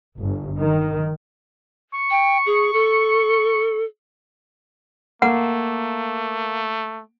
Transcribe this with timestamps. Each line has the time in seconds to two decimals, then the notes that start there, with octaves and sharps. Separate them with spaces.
0.18 G1
0.59 D#3
1.94 C#6
2.11 G5
2.46 G#4
2.73 A4
5.22 A3 A#3 F#5